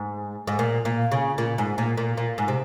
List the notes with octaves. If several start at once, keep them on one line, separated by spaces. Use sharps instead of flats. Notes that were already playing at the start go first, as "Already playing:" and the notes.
Already playing: G#2
G#2
A#2
A#2
C#3
A#2
G#2
A#2
A#2
A#2
G#2
C3